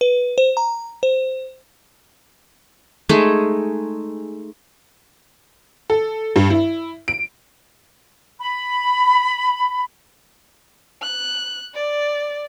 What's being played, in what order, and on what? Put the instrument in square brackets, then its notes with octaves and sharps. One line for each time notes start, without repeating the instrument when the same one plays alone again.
[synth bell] B4
C5
A#5
C5
[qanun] G#3 A3 D#4 G#4
[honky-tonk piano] A4
G2
E4
D7
[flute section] B5
[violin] F#6
D5